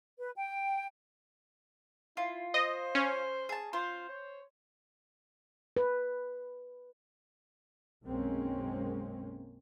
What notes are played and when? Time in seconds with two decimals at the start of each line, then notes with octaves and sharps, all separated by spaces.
0.18 B4
0.35 G5
2.17 E4 F4
2.54 C5 D#5
2.95 C#4
3.49 G#4 A5
3.73 F4 C5
4.09 C#5
5.77 B4
8.06 B1 F#2 G#3 A#3 C4 C#4